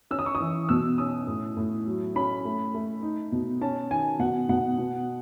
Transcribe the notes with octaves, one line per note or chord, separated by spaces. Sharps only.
C#4 E6
D#6
C#6
D#6
E3
B2 E6
C#4 D#6
A2
A2
F#3
C#4 B5
A3
A3
D#4
B2
C#4 A5
D#3 G#5
B2 F#5
B2 F#5
B2